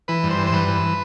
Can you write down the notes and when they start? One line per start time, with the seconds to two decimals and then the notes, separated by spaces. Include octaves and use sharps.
0.08 E3 B4
0.23 G2
0.31 C5
0.38 E3
0.47 C5
0.53 G2 B4
0.68 E3